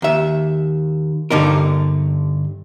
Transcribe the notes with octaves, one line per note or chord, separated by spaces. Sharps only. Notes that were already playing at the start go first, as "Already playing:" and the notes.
D#2 E5
G2 D3 D#4 A#4